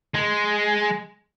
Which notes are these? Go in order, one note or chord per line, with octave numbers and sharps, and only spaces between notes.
G#3